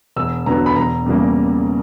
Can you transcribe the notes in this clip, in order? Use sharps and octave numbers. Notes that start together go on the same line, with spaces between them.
E1 E6
E2 D3 F#3 B3 A#5
B5
E1 A#5
E2 C#3 G3 A#3